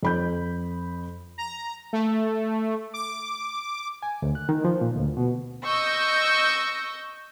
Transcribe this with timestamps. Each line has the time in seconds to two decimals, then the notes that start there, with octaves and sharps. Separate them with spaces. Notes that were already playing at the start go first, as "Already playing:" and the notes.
0.03 F2 B5 G6
1.38 A#5
1.93 A3
2.94 D6
4.03 G#5
4.22 D2
4.35 F#6
4.49 D#3
4.65 F3
4.81 A#2
4.96 D2
5.17 B2
5.65 D#5 C#6 E6 G6 A#6